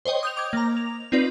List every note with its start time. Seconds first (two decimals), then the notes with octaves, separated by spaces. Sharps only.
0.05 C5 C#5 D#5 G5
0.23 D#6 G6 F7
0.37 D6 G#6
0.53 A#3 A#5
0.77 F7
1.12 C4 D#4 F4 B4 D5